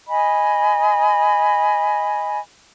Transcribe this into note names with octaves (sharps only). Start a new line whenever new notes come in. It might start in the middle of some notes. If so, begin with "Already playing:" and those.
D#5 G#5 B5